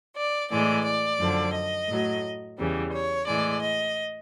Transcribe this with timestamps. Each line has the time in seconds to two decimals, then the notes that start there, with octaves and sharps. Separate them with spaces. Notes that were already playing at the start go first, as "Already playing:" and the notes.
0.16 D5
0.51 A2 E3 G#3 D5
0.85 D5
1.20 F#2 D3 F3
1.54 D#5
1.89 A2 F#3
2.58 E2 C#3 E3 G3
2.92 C#5
3.26 A2 E3 G#3 D5
3.62 D#5